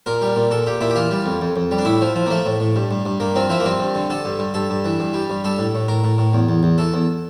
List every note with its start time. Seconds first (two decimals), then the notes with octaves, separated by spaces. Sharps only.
0.06 A#2 A#4
0.22 G3
0.36 A#2
0.51 A#2 A4
0.66 A#2 G4
0.81 A#2 E4
0.90 G4
0.95 E3 F4
1.11 G3
1.26 F2
1.41 F2
1.56 F2
1.71 G3
1.78 D4
1.85 A2 E4
2.01 F3
2.15 F3
2.26 A#3
2.30 F3 A3
2.46 A2
2.60 A2
2.76 G2
2.91 G2
3.05 G2
3.20 G2 A#3
3.36 F3 C4
3.49 F3 E4
3.60 A#3
3.65 G2 C4
3.80 G2
3.95 D3
4.10 D3 A4
4.25 G2
4.39 G2
4.54 G2 A4
4.70 G2
4.85 E3
5.00 G2
5.14 G3
5.30 G2
5.44 G3 A4
5.58 A2
5.75 A2
5.88 A2 A#4
6.04 A2
6.18 A2
6.33 E2
6.49 E2
6.63 E2
6.78 E3 A4
6.94 E2